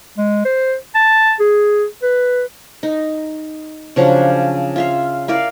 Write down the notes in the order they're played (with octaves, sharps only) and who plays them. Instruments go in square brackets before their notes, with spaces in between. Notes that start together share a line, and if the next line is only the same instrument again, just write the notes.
[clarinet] G#3
C5
A5
G#4
B4
[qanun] D#4
C#3 F3 F#3 D4
F4 E5 F5
E4 A#4 D5 F5